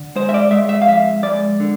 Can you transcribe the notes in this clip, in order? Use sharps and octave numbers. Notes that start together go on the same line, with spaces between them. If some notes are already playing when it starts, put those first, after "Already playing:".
Already playing: D3
G#3 C5
E5
D5
G#3 E5
E5
F5
F2 E5
G#3 D5
D3